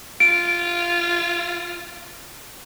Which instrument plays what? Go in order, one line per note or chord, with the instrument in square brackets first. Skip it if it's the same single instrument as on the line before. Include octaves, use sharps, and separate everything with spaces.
[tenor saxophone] F4 [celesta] D7